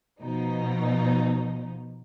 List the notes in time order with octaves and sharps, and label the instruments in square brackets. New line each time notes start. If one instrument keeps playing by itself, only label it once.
[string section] B2 F3 D#4